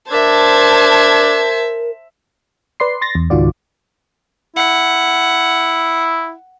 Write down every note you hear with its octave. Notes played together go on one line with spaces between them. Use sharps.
D4 A#4 C5 E5 A5 G#6
B4 D5 C6 C7
C6 A6 A#6
E2
C#2 G#2 D#3 F4 F#4 D5
E4 F#5